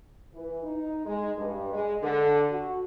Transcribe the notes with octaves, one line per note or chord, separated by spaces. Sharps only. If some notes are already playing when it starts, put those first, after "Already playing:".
E3
D#4
G#3
G2
G#3
D3
F#4